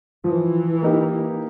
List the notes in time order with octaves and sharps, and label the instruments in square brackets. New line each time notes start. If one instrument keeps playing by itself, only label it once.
[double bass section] E3 [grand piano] F3
[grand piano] A#3 D#4 G4